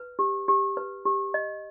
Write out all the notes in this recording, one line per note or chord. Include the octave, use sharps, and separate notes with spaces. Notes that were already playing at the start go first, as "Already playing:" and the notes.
Already playing: B4
G4
G4
B4
G4
D#5